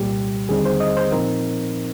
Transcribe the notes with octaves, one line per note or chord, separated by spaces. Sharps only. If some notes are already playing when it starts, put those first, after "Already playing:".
Already playing: C2 A#2 G3 G4
D#2 D3 G3 C4 D#4 G#4
C5
D#5
C5
A#2 F3 C4 D#4 A#4